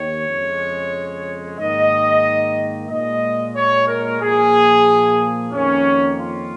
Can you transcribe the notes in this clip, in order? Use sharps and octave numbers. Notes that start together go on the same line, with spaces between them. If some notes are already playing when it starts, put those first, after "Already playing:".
Already playing: D#2 D#3 C#5
F2 C#3 G#3
G#2 D#3 A#3 D#5
A#2 G#3 D#5
C#5
A#4
A#2 F3 A#3 G#4
F2 D#3 A#3 C#4
F4